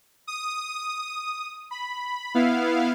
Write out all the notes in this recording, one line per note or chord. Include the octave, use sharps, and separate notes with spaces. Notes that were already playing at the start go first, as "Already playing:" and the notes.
D#6
B5
B3 E4 F5